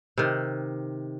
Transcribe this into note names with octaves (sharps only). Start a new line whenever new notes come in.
C3 D#3